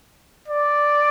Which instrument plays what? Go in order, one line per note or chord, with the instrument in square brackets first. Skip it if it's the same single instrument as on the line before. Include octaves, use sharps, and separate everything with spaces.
[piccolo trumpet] D5